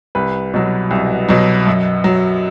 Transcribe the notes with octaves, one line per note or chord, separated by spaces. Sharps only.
C2 B4
B2 F#3
C2
B2 F#3
F#2
F#3